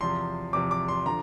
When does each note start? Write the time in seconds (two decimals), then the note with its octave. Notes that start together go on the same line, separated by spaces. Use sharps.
0.01 E2 C3 F3 C6
0.53 E2 C3 F3 D6
0.71 D6
0.88 C6
1.06 D3 F3 A#5